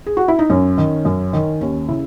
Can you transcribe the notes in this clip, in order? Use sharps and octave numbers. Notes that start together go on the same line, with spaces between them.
G#4
F#4
E4
D#4
F#2 C#4
D#3
F#2
D#3
D#2 C#4
C#3 E4